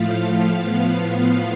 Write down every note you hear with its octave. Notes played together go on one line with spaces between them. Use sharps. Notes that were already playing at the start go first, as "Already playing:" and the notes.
Already playing: A2 F3 A3 F5
A2 F3 B3 F5